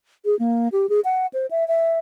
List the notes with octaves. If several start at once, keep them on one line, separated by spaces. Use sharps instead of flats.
G#4
A#3
G4
G#4
F#5
C5
E5
E5